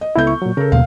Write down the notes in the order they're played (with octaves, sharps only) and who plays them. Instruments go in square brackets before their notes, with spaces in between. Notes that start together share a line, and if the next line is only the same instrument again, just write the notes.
[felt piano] D#5
[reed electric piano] C#2 E4 [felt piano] B3 A4 G6
[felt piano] C#6
[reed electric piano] A#2 F#3
[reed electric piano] C#3 [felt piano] A4 A#4
[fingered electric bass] D#2 B2 A#3 [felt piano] F5